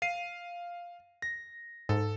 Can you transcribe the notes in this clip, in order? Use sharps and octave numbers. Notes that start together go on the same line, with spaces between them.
F5 C7 D#7
A#6
G#2 A4